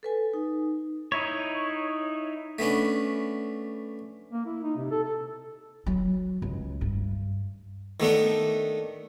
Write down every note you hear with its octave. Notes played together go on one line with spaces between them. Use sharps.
A4 B4 G#5
D#4
D#4 E4 C#5
A3 B3 C#4 D4
A#3
E4
D#4
C3
A4
A4
F#3
C#2
G2
D#3 A3 B3 D4